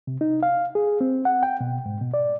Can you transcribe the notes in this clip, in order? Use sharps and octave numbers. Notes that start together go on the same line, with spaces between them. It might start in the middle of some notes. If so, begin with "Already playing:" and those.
C3
D#4
F5
G#4
C4
F#5
G5
B2
G#2
B2
D5